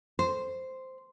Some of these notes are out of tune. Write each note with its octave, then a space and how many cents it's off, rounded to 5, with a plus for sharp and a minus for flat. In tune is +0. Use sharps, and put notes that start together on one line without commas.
C5 -5